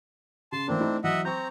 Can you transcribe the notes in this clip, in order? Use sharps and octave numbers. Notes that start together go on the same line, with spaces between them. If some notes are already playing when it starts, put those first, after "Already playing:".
C#3 A5 C6
E3 A3 A#3 C4 D4
A3 D#4 E4
E3 F#3 D#5 E5 F#5
C4 A#5 C#6 G6